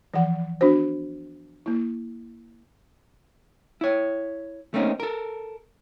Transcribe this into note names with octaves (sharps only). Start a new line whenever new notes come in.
E3 F3 F#5
B3 D4 F#4 C5
A#3 E4
E4 C#5
A3 A#3 C4 C#4 D#4
A4 A#4